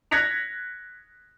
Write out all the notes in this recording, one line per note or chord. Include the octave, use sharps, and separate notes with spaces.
F#6 G#6 A#6 B6 C#7 F7